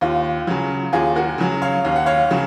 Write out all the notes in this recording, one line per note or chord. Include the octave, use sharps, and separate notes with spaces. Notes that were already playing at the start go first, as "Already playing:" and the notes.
D#2 F4
C#3 F#3
D#2 F4 G#4
F#4 A#4
C#3 F#3
C#5 F5
D#2 F5
F#5
C#5 F5
C#3 F#3